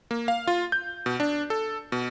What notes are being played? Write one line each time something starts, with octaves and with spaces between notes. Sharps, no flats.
A#3
F5
F4
G6
B2
D4
A4
B2